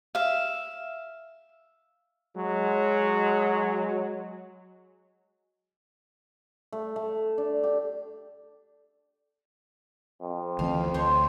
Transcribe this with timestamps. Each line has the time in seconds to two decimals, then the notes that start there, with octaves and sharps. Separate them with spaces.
0.15 E5 F5
2.36 F#3 G#3
6.72 A3
6.96 A3
7.38 D4
7.63 G4
10.22 F2
10.59 D2 E3 C4 F5
10.94 D2 C5 C#5 C6